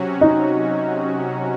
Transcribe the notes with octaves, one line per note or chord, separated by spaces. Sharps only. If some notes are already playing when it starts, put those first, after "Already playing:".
Already playing: C3 F#3 C#4 F#4
D#4